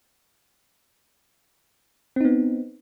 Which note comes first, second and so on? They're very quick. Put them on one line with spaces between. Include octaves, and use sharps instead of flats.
C4 D#4 B3